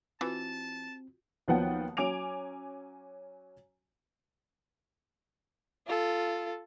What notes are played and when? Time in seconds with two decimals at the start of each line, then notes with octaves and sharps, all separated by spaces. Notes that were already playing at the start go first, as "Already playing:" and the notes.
0.21 E3 C4 F4 F#4 A5
1.48 D#2 F3 F#3 B3 F#5 G5
1.97 F#3 C#4 G#5 D6 D7 F7
5.87 F4 A4